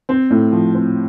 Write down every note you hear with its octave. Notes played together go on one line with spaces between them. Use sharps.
C4
A2
F3
C4